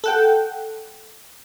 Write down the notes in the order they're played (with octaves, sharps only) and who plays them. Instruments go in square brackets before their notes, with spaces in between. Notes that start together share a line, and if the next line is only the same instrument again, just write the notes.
[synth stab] A4 F#5 G5